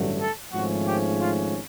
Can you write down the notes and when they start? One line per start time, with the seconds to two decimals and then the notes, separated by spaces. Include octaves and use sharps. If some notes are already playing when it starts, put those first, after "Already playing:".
Already playing: A1 G2 D3 F#3 A3
0.19 A4
0.53 G#1 G#2 F3 A3 C#4 F#4
0.86 G4
1.19 F4